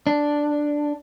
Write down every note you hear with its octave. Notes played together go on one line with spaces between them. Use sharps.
D4